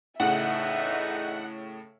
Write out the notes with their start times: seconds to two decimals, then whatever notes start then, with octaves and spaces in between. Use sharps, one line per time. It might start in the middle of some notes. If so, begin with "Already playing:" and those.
0.20 A2 C#3 E3 D4 D#4 E5 F#5